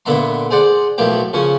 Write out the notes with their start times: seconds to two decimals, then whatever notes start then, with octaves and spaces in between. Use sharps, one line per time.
0.06 A#2 D3 B3 E5 A#5 C6
0.51 G#4 C5 D5 F#5
0.98 B1 A2 F3 A#3 G4
1.33 C#3 F3 C#4